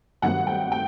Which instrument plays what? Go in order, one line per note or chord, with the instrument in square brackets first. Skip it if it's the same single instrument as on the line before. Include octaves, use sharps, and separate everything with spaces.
[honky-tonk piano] G2 D#3 F#3 A3 C4 F#5
G5
G5